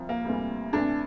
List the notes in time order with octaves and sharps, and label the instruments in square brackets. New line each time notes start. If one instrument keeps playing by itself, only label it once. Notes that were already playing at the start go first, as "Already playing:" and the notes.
Already playing: [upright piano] C2 F3
A#3
D2 C3 E3 G3
D2 C3 E3 D4